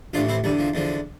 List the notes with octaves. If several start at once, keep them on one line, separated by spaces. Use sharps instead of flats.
A1 A2 E3 D4 F4
C4 E4
E2 D3 G3
F3
E2 D3 F3